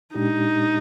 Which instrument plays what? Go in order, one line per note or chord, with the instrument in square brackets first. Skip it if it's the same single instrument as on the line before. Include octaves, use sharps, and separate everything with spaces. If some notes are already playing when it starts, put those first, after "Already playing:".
[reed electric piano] A#2 G#3 D4 G4 [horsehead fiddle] D#4